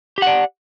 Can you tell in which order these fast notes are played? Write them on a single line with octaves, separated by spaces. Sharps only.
G4 F#5 D5